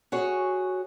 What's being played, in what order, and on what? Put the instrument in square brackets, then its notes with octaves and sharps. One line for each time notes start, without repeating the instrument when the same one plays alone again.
[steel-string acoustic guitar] F#4 G#4 C#5